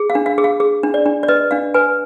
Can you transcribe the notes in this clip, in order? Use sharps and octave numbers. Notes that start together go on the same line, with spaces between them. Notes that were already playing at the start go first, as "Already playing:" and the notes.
Already playing: G#4
F5
D4
F5
G#4
F5
G#4
D4
D5
D4
D5
B4 D#5
D4 F5
B4 G#5